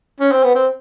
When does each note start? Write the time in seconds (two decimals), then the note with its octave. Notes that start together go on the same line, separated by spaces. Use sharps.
0.20 C#4
0.32 C4
0.44 B3
0.55 C4